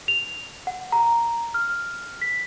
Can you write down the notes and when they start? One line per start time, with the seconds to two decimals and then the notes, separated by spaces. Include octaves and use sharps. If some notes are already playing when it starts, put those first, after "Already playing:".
0.08 F7
0.67 F#5
0.92 A#5
1.54 F6
2.22 B6